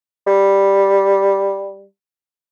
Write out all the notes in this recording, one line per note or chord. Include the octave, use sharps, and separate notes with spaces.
G3